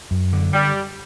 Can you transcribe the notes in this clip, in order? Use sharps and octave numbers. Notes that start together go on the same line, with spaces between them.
F#2
D3
G3